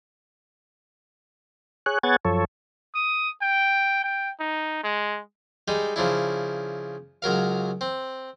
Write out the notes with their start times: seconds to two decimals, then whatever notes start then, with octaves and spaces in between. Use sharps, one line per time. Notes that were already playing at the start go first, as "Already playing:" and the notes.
1.86 G#4 C#5 F#6
2.03 B3 G#4 C#5 F#5 G#6 A6
2.25 F#2 F3 A4 C#5
2.95 D#6
3.42 G5
4.04 G5
4.40 D#4
4.84 G#3
5.68 G3 G#3 D#4
5.96 C#3 F3 D4 E4
7.22 C#2 F#3 A#4 F5
7.81 C4